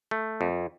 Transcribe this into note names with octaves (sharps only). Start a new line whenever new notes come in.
A3
F2